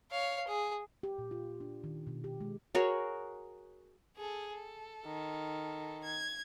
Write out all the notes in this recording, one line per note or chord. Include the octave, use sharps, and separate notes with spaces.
C#5 F5
G#4
G4
A#2
F4
D4
D#3
B2
G4
G#3
F#4 G#4 A#4 C#5
G#4 A4
A4
D#3
G#6